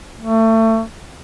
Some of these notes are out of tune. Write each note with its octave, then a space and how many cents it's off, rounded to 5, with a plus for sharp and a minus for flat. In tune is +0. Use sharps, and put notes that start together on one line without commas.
A3 +30